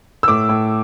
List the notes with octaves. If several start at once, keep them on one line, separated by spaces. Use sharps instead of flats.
E6
A2 D6
A2